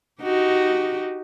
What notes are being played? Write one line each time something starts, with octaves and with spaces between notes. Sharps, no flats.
D#4 F#4 G4